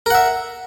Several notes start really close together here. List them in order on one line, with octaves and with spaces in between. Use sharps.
A#4 F#5 E5